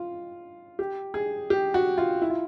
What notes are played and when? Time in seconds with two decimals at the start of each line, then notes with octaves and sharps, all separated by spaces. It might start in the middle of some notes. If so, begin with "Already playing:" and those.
Already playing: F4
0.79 G4
1.14 G#4
1.50 G4
1.74 F#4
1.98 F4
2.22 E4
2.30 F4